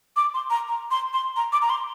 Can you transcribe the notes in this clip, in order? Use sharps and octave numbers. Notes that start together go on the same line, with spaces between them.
D6
C6
A#5
A#5
C6
C6
A#5
D6
A#5
C6